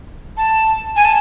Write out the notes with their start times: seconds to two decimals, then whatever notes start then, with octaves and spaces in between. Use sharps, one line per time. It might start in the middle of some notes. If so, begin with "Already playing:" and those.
0.37 A5
0.96 G#5
1.05 A5